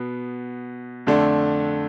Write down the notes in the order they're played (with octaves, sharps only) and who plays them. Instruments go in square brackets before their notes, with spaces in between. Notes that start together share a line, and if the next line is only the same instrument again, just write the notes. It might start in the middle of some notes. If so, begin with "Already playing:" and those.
Already playing: [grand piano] B2 B3
F2 D3 A3 D4